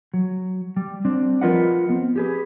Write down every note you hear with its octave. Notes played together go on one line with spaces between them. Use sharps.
F#3
G3
G3 C4 D4
F3 F4 A#4 B4 D#5 F#5
B3 C4
G4 G#4 B4